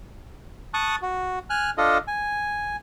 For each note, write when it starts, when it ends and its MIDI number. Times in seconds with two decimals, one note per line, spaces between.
0.74 0.96 81
0.74 0.96 85
0.74 0.96 87
0.74 0.96 90
1.02 1.39 66
1.50 1.70 80
1.50 1.70 89
1.50 1.70 90
1.78 1.98 62
1.78 1.98 65
1.78 1.98 69
1.78 1.98 75
2.08 2.76 80